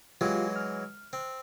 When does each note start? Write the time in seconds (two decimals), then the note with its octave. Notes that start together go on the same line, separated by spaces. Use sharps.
0.21 E3 F#3 G#3 F4 G4 F5
0.56 F6
1.13 C4